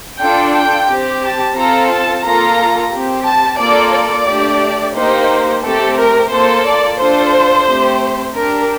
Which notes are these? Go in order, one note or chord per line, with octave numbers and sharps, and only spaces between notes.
D4 F4 A4 G5
G5
C4 G4
A5
C4 F4 A4 A#5
A5
A#3 F4 A4 A#5
C4 G4
A5
A#3 F4 A4 D5
D5
A3 D4 G4
A#3 D#4 G4 C5
A3 C4 G4 A4
A#4
A#3 F4 A4 C5
D5
D4 F4 A4 C5
A3 C4 G4
D4 G4 A#4